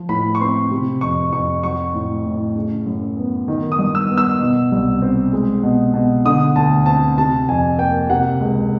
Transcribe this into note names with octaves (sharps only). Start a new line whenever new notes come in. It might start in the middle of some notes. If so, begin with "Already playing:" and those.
Already playing: F3
A2 B5
C#6
C4 C6
C3
F2 C#6
F2 C#6
F#3 C#6
A2
A2
C#3
F#2
B3
D#3
D#6
G2
E6
B3
E6
B2
C2
C4
G#3
B2
B2
D3 D#6
D2 A5
C4 A5
C3 A5
F2 G#5
A#3 G5
C3 F#5
C#2